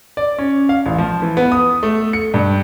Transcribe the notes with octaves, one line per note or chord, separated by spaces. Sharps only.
D5
C#4
F5
A1
F3
E3
B3
D#6
A3
C#7
G2